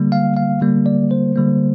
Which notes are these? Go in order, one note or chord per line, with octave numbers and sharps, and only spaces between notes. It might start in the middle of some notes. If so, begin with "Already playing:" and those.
Already playing: D3 G3 A#3
F5
F5
D3 G3 A#3
D5
C5
D3 G3 A#3